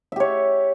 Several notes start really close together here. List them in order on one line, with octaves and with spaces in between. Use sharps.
E5 G4 C#5